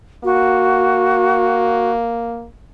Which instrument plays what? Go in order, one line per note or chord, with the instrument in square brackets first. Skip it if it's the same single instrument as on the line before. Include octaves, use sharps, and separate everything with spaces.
[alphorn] A#3 [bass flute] F#4